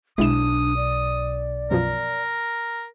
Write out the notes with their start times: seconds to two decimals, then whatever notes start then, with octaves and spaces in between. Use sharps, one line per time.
0.18 B1 G#3 D4 E4 D#6 E7
0.76 D5
1.71 F#2 B2 F3 A#4